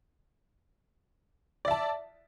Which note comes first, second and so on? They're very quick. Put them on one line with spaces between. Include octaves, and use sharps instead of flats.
D5 E5 A5